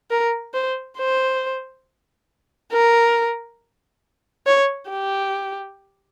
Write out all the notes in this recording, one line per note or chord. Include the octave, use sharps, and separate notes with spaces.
A#4
C5
C5
A#4
C#5
G4